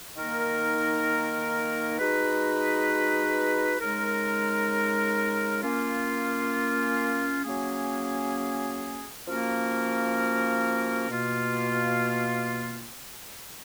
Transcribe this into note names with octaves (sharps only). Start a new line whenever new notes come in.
D#3 A#3 D#4 A#4
G#3 D#4 F#4 B4
C#3 G#3 D#4 A#4
A#3 C#4 F4
F#3 A#3 C#4 G#4
F3 A#3 C#4 F#4 A#4
B2 A#3 F4